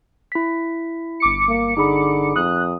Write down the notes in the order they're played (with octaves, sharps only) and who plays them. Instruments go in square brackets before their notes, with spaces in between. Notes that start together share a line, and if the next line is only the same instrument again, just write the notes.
[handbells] E4 B6
[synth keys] G1 D6 C#7
[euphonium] A#3
[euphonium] D3 [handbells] D#4 G#4 B5
[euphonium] F2 [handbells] D#6 [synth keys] F#6